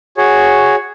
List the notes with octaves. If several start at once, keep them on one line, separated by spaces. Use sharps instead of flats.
F#4 G#4 C#5